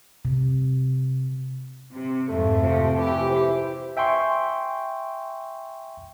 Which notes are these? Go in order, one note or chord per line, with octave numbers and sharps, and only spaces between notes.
C3
C3
F2 G#2 A3
C3 F3
E3 G4
E4 C5
E5 G5 G#5 C6 C#6